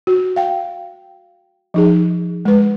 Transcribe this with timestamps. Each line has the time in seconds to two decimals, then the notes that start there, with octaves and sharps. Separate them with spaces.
0.07 F#4
0.36 F5 G5
1.74 F3 D#4 G#4
2.45 G#3 B4